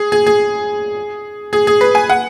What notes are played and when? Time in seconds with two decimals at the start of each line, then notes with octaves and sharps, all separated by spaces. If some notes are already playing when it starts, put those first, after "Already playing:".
Already playing: G#4
0.12 G#4
0.26 G#4
1.53 G#4
1.67 G#4
1.81 B4
1.95 G#5
2.10 F#5